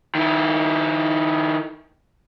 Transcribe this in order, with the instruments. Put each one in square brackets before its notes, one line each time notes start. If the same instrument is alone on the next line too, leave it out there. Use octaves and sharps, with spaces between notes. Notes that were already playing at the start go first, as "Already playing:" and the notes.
[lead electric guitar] D#3 E4